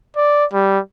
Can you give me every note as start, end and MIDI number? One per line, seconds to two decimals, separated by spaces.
0.16 0.45 74
0.53 0.79 55